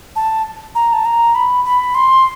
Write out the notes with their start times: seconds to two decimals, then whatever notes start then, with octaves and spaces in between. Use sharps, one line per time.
0.16 A5
0.75 A#5
0.93 A5
1.05 A#5
1.35 B5
1.65 B5
1.95 C6